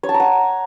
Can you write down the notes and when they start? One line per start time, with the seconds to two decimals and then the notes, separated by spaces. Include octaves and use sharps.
0.03 C#5
0.09 A5
0.14 A#5
0.20 F#5